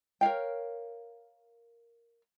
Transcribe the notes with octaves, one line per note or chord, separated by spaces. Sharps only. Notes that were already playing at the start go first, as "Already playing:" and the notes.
A#4 C#5 F5 G5